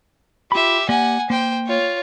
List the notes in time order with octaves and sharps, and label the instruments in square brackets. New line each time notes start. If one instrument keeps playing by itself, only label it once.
[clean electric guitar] F4 B5 [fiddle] G4 E5
[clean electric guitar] A#3 G4 D5 [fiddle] F#5 G#5
[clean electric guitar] A#3 [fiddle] C5 G5
[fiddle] F4 C#5